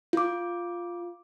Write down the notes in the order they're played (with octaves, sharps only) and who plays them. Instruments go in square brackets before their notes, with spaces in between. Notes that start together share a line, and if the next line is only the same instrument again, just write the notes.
[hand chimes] F4 D6